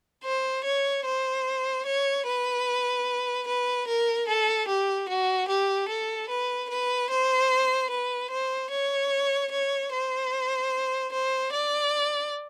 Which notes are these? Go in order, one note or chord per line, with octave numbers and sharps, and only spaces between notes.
C5
C#5
C5
C#5
B4
B4
A#4
A4
G4
F#4
G4
A4
B4
B4
C5
B4
C5
C#5
C#5
C5
C5
D5